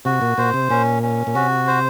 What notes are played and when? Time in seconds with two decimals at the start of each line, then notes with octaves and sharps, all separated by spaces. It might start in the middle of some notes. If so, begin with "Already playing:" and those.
0.05 C3 F#4
0.22 A#2
0.38 A#2 C5
0.54 C3
0.70 A#2 C#4
1.03 C#4
1.27 A#2
1.35 C3 F#4
1.68 C5